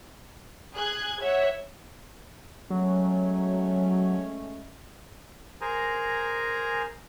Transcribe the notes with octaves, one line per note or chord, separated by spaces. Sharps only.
G#4 F#6 G#6
C#5 E5 F#5
F#3 G#3 A3 C#4
G#4 A#4 C5 G#5 A#5